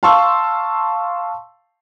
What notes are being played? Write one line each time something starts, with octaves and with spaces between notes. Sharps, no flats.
F5 A5 C6 C#6 E6